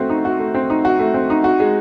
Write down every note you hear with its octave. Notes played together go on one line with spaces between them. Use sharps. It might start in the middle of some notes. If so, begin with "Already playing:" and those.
Already playing: A3 C4 F#4
D#4
F#4
A3
C4
D#4
F#4
A3
C4
D#4
F#4
G#3